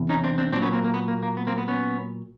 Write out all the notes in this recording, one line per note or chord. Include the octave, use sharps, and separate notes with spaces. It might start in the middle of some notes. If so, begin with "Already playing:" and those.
Already playing: E2 C3 E3
C#4 D#4
C4 D4
C4 D4
A#2 F#3 C4 D4
B3 C#4
A#3 C4
A#3
B3
A#3
A#3
B3
A#3 C4
B3
B3 C#4